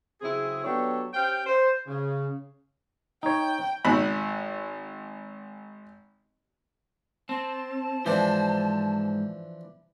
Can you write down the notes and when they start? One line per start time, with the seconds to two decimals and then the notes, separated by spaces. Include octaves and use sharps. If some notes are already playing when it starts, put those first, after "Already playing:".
0.21 C#3 F#3 C4 E4 G#4
0.64 F#3 B3 D4 G4 A4 C#5
1.13 C#4 G4 C5 F5 G5
1.46 C5
1.87 C#3
3.23 D#4 C#5 G5
3.85 G#1 B5
7.29 C4 A5
8.06 G#2 E3 F3 D4 C5